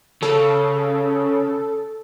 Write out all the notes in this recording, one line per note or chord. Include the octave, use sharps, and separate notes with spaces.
C#3 A4